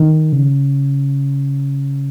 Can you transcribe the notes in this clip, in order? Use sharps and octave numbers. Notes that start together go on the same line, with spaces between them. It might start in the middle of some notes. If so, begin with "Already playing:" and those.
Already playing: D#3
C#3